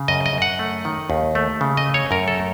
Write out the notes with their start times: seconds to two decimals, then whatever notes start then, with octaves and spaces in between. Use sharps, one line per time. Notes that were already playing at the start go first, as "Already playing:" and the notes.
Already playing: C#3
0.08 F#2 D#5
0.26 D#5
0.33 F#2
0.42 F#5
0.59 A3
0.85 D#3
1.10 D#2
1.35 A3
1.61 C#3
1.77 D#5
1.86 A3
1.94 C#5
2.11 F#2 A#4
2.28 A4
2.37 A3